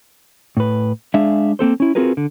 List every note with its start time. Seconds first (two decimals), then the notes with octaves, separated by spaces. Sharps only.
0.57 A2 B4
1.14 G#3 D4 G#4 E5 F5
1.59 A#3 C4 A4 C5
1.80 C#4 E4
1.95 C4 F4 F#4 G#4 A#4 B4
2.17 D3